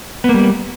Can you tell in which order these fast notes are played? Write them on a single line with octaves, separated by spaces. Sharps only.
B3 A#3 G3